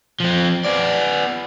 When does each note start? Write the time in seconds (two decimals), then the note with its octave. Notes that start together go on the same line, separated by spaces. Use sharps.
0.20 F3 C4
0.65 B3 D5